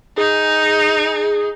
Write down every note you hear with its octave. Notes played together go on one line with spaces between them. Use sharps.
D#4 G#4